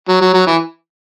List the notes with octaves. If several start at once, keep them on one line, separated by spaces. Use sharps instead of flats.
F#3
F#3
F#3
E3